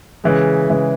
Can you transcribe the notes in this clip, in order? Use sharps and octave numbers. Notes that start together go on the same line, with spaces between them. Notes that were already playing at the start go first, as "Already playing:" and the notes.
C#3 E3 G#3
C#3 E3 G#3